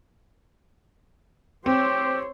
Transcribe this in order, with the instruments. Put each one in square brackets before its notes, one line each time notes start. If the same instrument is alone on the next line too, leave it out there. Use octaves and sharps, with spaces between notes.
[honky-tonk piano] C4 [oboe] G4 [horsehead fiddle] C5 C#5